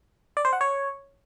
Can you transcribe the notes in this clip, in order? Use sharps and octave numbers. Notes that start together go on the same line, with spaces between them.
D5
C5
F#5
C#5